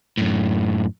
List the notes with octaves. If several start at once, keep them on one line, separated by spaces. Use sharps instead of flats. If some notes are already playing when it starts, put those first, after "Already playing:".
F#2 A2